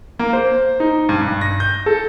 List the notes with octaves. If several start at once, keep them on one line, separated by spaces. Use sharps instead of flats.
A#3
C5
D#4
G2
G2
A#6
G6
A4